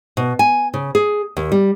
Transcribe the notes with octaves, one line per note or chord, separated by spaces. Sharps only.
B2
G#5
C#3
G#4
D#2
G3